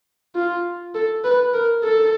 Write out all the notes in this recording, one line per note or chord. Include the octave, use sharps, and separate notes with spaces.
F4
A4
B4
A#4
A4